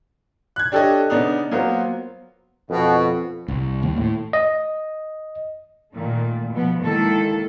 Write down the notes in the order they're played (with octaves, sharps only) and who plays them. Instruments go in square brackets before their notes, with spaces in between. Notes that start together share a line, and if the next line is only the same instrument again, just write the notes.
[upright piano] F#6 G#6
D4 G4 A4 C#5 D#5
C#3 B3 D4 D#4
F#3 A#3 B3 F4 C5
[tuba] F2 [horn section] B2
[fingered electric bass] C2
D#2
A2
[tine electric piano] D#5
[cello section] A#2 D#3 A3
B2 F3 B3
D#3 G#3 A#3 E4 A4